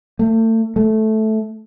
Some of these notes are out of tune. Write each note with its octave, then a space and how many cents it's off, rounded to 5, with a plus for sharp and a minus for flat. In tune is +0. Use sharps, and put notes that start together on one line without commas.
A3 +35
A3 -10